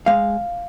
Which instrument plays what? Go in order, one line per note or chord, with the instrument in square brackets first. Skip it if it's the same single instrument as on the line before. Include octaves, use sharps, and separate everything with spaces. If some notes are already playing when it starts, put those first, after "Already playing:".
[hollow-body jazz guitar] G#3 F5